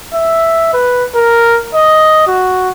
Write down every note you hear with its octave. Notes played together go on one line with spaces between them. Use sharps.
E5
B4
A#4
D#5
F#4